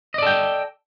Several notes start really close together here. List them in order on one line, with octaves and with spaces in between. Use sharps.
D#5 D5 A4 G5